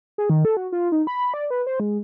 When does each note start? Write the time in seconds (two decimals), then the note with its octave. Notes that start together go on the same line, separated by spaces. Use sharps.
0.18 G#4
0.30 D#3
0.45 A4
0.57 F#4
0.72 F4
0.92 D#4
1.07 B5
1.34 D5
1.50 B4
1.67 C5
1.80 G#3